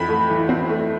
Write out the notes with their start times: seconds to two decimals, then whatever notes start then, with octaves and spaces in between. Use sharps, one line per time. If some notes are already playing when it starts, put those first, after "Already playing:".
Already playing: F2 E3 B5
0.09 A3
0.30 E3
0.49 C4
0.69 A3